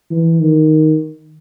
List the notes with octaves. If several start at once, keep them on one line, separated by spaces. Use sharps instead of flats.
E3
D#3